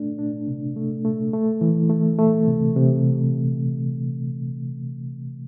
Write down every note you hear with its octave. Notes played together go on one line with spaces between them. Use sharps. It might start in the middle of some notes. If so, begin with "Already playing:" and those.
Already playing: A3 D4
D4
C3
A3
A3
A3
E3
A3
A3
C3
C3